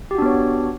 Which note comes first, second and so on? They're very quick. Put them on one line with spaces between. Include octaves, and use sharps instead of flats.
G4 F#4 D4 B3 C#5